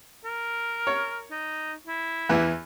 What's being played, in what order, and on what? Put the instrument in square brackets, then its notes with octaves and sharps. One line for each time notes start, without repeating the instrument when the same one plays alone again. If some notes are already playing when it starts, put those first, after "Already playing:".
[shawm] A#4
[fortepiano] C#5
[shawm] D#4
E4
[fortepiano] E2 E3